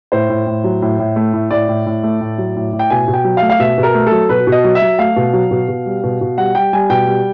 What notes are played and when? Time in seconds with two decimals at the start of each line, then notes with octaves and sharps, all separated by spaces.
0.12 A2 C5
0.29 A2
0.47 A2
0.64 F#3
0.82 A2
0.99 A2
1.16 A3
1.33 A2
1.51 A2 D5
1.68 A2
1.86 A2
2.03 A3
2.21 A2
2.38 F#3
2.56 A2
2.73 A2
2.79 G5
2.90 B2 G#5
3.08 B2
3.14 G5
3.24 F#3
3.37 F5
3.42 A3
3.49 F5
3.59 B2 E5
3.78 B2
3.83 A#4
3.94 A3
4.07 F#3 A4
4.29 B2 B4
4.47 B2
4.52 D#5
4.64 F#3
4.75 E5
4.82 F#3
4.99 A3 F5
5.16 B2
5.33 F#3
5.51 B2
5.68 B2
5.86 G3
6.03 B2
6.21 B2
6.38 G3 F#5
6.55 G3 G5
6.73 G3 G#5
6.90 B2 G5
7.07 G3